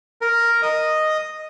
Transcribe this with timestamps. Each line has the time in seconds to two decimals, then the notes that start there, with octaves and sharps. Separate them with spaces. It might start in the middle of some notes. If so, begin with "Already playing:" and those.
0.22 A#4
0.62 D#5